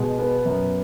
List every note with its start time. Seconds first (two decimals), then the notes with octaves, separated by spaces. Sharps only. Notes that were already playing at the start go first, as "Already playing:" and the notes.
Already playing: B2 G#3
0.19 B3
0.45 F#2